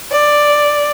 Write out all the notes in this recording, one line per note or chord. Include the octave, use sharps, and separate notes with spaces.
D5